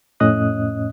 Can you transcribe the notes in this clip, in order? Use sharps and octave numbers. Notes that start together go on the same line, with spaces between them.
F2 A2 C#4 D#5 D#6 F#6